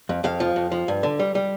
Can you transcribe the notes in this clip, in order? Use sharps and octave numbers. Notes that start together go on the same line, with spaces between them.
F2
F2 F5
F3
F2
F3
G2
D3
G3
G3